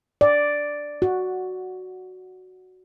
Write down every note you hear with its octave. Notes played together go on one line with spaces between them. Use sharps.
D5
F#4